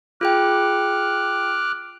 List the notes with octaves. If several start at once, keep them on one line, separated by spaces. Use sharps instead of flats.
F4 G#4 G5 D6 F6 F#6